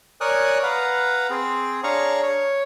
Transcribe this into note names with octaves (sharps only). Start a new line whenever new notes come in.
A#4 C#5 D5 G#5 D#6 F#6
B4 F5 F#5 A#5
C4 G#4
D4 G#4 C#5 F5 A#5 C#6
C#5